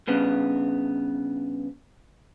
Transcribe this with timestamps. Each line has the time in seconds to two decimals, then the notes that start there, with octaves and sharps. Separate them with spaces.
0.07 G2 C#3 B3